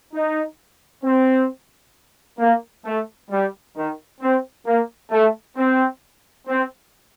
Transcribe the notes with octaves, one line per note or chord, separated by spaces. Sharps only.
D#4
C4
A#3
A3
G3
D#3
C4
A#3
A3
C4
C4